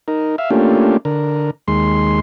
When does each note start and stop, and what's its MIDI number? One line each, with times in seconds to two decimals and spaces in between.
0.08 0.36 63
0.08 0.36 70
0.38 0.50 76
0.38 0.50 77
0.50 0.97 57
0.50 0.97 58
0.50 0.97 61
0.50 0.97 62
0.50 0.97 65
0.50 0.97 67
1.05 1.51 50
1.05 1.51 70
1.68 2.20 39
1.68 2.20 56
1.68 2.20 84